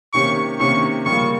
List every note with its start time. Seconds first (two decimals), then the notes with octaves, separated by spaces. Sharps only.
0.13 C3 D#3 A#3 C#4 G4 C#6
0.59 C3 D#3 A#3 C#4 G4 C#6
1.06 C#3 G3 A#3 F4 C#6